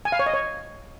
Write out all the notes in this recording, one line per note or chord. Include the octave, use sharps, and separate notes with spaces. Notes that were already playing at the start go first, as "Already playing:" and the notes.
G#5
F5
C#5
D#5
C#5